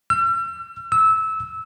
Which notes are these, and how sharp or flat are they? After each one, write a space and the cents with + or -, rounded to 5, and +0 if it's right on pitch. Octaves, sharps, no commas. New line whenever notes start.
E6 +45
E6 -20